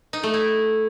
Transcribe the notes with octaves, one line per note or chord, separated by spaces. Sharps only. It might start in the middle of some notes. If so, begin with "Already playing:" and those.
D#4
A3
E4